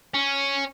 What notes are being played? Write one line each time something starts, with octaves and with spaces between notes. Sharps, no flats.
C#4